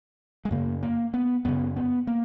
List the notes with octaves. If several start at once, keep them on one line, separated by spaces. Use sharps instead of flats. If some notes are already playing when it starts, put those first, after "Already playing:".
G#3
F#2 C#3 A#3
A#3
B3
F#2 C#3 B3
B3
A#3